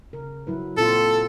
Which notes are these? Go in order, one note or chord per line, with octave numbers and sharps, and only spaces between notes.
C#3 A#4
F#3 E4 B4
A#2 C4 F4 A4